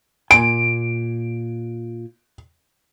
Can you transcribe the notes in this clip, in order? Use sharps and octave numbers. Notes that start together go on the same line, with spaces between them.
A#2 G#5 D7